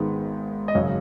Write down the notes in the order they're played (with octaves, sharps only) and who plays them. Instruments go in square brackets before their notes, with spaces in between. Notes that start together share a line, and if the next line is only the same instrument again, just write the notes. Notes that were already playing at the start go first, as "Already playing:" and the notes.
Already playing: [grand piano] G#1 G#2 D#3 G#3 B3
D#5
G#1 F#2 C#3 C#5